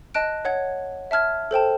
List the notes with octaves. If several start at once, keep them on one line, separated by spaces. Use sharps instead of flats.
D#5 A5 F#6 D7
C#5 F#5 G#6
E5 A5 F6 G#6
A4 C5 G5 A5